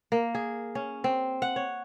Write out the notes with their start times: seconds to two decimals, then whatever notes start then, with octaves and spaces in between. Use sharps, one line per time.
0.12 A#3
0.35 G#4
0.75 C#4
1.04 C4
1.42 F#5
1.56 C#5